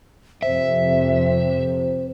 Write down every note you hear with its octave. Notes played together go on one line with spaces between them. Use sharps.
F2 C3 C5 E5